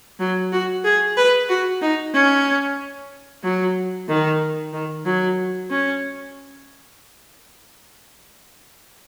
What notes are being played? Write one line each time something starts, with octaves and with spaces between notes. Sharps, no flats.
F#3
F#4
G#4
B4
F#4
D#4
C#4
F#3
D#3
D#3
F#3
C#4